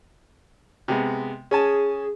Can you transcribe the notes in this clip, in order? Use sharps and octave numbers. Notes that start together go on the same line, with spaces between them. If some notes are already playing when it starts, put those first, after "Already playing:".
C3 G#3 B3
C#4 G#4 G#5 A5